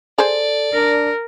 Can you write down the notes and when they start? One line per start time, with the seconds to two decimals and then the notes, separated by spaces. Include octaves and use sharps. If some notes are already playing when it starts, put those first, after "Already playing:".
0.18 G#4 A4 C5 D5
0.73 D4 A#4